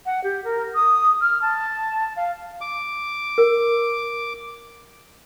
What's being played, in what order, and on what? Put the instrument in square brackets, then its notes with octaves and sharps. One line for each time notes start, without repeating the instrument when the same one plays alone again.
[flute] F#5
G4
A#4
D#6
F6
A5
F5
[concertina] D6
[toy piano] A#4